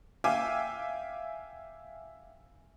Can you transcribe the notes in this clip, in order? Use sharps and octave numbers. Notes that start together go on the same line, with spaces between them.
E5 F5 G5 G#5 D6 E6